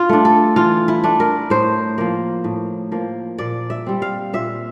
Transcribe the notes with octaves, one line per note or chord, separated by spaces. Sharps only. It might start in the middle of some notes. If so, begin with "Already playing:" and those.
Already playing: F4
A3 D4
A4
E3 F4
E4
A3 D4
A#4
A2 C5
F3 A#3
A2
F3 A#3
A#2 D5
E5
G3 C4
F5
A#2 E5